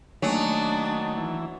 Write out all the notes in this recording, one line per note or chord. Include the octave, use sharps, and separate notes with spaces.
D#3 F#3 A3 A#3 D4 G#5
E3